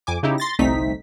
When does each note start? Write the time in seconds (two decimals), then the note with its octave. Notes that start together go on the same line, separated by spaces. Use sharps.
0.07 F2 G#5 D6
0.23 C#3 D#4 E4 G4
0.38 C6 A6 A#6
0.59 G1 C2 A3 C4 D#4 B6